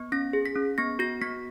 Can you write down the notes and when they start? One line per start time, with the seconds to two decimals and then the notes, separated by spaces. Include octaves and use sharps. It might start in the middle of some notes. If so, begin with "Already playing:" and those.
Already playing: B3
0.12 C#4 A#6
0.33 G#4
0.46 B6
0.55 C#4
0.78 B3 A#6
0.99 F#4 A#6
1.21 B3 B6